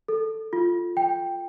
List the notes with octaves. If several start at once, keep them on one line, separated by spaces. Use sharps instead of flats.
A4
F4
G5